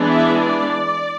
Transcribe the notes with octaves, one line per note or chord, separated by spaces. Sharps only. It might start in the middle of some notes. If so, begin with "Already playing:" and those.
Already playing: E3 G#3 B3 D4
E5
D5